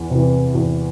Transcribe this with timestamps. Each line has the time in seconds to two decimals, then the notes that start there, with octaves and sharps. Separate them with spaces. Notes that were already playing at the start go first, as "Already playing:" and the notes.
Already playing: E2
0.10 C3 E3
0.55 E2